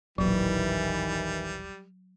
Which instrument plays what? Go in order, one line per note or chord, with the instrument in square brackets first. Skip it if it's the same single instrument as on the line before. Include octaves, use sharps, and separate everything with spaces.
[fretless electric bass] D#1 A1 [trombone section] D#3 E3 [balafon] F#3 [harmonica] G3